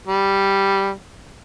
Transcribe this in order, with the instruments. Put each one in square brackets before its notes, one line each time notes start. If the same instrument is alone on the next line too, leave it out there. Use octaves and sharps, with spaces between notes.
[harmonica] G3